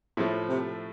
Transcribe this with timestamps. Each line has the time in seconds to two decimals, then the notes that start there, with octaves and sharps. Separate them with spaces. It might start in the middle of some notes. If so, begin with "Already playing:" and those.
0.17 A2 F3 A3
0.48 C3